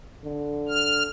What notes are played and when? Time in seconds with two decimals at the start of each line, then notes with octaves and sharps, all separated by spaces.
0.24 D3
0.69 F6